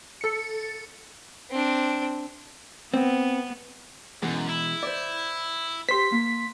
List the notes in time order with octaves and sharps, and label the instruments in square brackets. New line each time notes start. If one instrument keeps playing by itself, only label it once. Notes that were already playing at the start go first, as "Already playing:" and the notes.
[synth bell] A4 C#7
[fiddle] C4 D4
[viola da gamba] B3 [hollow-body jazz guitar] C4
[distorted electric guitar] F#2 [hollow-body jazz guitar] B2 E3 G#3
[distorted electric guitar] E4
[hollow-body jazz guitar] C5 D5
[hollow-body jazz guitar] G4 C5 [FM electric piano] C6 B6
[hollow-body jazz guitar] A#3